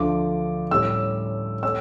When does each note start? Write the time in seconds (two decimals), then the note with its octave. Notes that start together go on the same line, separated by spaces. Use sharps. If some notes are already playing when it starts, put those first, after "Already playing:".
Already playing: D2 D3 F3 D6
0.71 A2 G3 C#4 E6
1.63 A3 C#4 E6